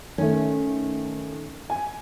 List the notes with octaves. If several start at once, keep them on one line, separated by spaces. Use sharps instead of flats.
D#3 A3 C#4
G#5